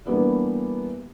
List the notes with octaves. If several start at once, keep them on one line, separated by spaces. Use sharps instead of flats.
E3 G3 A#3 B3 D4 E4